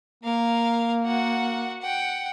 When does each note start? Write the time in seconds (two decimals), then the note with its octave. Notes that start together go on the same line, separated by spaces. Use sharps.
0.24 A#3 A#4 F5
1.05 F#4 F#5
1.82 F#5 G5